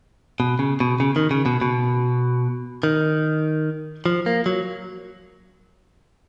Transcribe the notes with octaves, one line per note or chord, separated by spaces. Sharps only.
B2
C#3
B2
C#3
D#3
C#3
B2
B2
D#3
F3
A#3
F#3